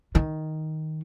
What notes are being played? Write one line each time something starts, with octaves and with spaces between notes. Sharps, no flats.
D#3